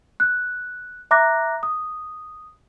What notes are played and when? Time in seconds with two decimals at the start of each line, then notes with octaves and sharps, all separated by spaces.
0.20 F#6
1.11 E5 A#5 D6 F#6 A#6
1.63 D#6